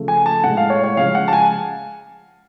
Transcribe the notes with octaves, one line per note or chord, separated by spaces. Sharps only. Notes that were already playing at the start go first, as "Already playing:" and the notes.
Already playing: C#3 F3 A3
G#5
A5
A2 G#3 F#5
F5
C#5
C#5
C#3 F3 G#3 F5
F#5
A5
G#5